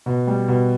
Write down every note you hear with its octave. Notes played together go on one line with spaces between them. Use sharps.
B2
G3
B2